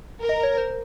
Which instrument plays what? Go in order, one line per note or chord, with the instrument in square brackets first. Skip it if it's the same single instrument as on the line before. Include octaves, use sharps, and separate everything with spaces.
[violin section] A#4
[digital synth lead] D#5
C#5
C5